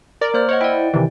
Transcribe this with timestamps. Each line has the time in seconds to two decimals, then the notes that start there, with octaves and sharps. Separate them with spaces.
0.21 A#4 D5
0.34 A#3 C5 F6
0.49 C5 C#5 D#5 F#5
0.61 E4 D5 G5
0.94 C3 D#3 E3